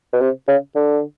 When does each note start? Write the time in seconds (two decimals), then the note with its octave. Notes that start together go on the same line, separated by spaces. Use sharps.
0.13 B2
0.21 C3
0.48 C#3
0.75 D3